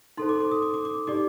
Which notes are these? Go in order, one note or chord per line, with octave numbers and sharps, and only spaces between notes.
D#4 A4 C5 C6
D6
D6
D#6
D6
D6
D6
D#4 G4 D5 D6